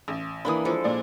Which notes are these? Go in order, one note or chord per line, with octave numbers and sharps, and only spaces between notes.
A1
E3 A#3 D4 B5 D#6
F3 G#3 A4
A#2 D5